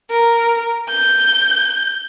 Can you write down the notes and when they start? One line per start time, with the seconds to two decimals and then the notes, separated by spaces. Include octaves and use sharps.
0.10 A#4
0.89 G6